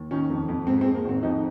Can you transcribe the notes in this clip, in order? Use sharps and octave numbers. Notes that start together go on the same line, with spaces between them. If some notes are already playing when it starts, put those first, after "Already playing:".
Already playing: D#2
D#3 C#4
F2
F2
G#2 C4
C4
G#3
A#3
G#1 C4
F2 D#4